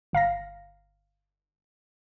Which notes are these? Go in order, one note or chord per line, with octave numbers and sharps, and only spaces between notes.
G1 F5 A#5 A#6